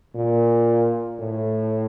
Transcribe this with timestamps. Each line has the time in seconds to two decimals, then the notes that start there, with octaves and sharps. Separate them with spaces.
0.15 A#2
1.20 A2